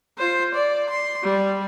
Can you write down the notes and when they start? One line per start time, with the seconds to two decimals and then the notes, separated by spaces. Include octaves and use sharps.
0.18 F4 C5
0.54 D5
0.90 C6
1.23 G3